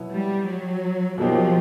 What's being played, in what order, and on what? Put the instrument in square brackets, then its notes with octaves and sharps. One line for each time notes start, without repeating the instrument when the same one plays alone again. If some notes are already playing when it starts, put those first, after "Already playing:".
Already playing: [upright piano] B2 F#3 B3 E4
[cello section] G3
F#3
[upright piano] B2 F#3 A#3 D#4 G4 [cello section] F3